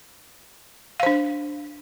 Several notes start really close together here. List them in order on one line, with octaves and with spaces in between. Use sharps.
F5 C5 D4